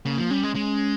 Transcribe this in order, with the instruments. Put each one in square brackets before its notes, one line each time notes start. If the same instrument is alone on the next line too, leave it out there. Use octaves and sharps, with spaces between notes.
[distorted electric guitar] C#3 [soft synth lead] A#3
[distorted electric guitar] F3
[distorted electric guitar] G3 [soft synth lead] C#4
[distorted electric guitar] G#3
G#3